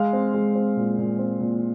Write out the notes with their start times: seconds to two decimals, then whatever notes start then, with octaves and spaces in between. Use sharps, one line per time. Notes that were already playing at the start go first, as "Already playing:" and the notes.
Already playing: G#3 F5
0.13 C4
0.34 G#3
0.55 C4
0.77 A#2
0.98 A#2
1.19 C4
1.40 A#2